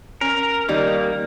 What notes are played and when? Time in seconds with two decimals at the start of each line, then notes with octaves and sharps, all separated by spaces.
0.21 C#4 A#4
0.69 D#3 G3 A#3